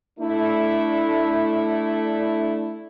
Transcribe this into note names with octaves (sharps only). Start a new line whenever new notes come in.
A3 D4 E4